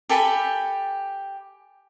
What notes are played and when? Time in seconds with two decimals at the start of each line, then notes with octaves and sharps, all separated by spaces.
0.09 G4 A4 G#5 B5